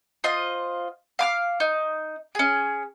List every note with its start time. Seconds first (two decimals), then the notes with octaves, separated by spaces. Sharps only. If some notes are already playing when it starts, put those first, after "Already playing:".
0.24 F4 C5 D#5
1.19 F5 D6 F6
1.60 D#4
2.35 C#4 G#4